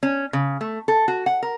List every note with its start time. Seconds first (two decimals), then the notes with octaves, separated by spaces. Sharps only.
0.03 C#4
0.33 C#3
0.61 A3
0.88 A4
1.08 F#4
1.26 F#5
1.43 A#4